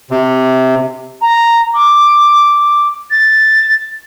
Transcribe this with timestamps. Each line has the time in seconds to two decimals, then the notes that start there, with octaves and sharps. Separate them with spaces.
0.11 C3
1.22 A#5
1.74 D6
3.11 A6